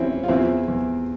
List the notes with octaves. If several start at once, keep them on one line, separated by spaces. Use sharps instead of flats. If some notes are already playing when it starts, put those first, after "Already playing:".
Already playing: E2 E3 C4 C#4 E4 F4
F4
E2 C4 E4
E2